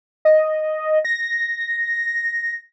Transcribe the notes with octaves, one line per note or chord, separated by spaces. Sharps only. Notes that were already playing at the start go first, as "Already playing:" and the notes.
D#5
A#6